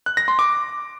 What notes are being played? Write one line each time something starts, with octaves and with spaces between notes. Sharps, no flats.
F#6
A#6
C6
D6